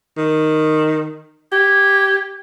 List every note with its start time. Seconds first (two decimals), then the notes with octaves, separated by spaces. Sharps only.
0.17 D#3
1.52 G4 G#6